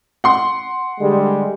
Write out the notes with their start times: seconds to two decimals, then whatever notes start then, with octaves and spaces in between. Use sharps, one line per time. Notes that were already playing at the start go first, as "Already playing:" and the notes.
0.24 F#5 C6
1.00 D3 G3 G#3